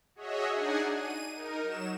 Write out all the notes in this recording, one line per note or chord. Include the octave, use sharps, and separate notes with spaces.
F#4 G#4 C#5 D#5 E5
D4 D#4 G#4 F#5 G#5
D#7
D#4 A#4
F#3 E7